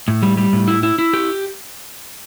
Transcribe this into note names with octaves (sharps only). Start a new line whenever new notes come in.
A2
G3
G3
A2
E4
E4
E4
G4